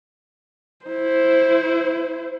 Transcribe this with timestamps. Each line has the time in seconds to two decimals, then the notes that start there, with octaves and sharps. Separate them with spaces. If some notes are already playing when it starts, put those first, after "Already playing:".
0.85 E4 C5